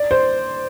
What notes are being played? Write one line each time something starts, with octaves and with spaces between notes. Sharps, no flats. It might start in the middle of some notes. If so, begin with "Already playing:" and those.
Already playing: D5
C5